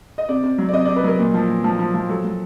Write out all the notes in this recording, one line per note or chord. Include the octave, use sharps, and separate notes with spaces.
D#5
C3 D5
C3
F#3
D5
C3 D#5
C3 D5
B4
F#3 A#4
A#2
F3
A#2
F3
F3
F3
F#3 A4
F#3